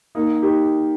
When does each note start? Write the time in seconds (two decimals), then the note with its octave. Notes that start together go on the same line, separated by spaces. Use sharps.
0.15 A#3 D#4
0.42 D#4 G4